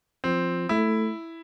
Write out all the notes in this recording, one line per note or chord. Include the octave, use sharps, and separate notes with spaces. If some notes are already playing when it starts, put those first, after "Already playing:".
F3 C4
A3 E4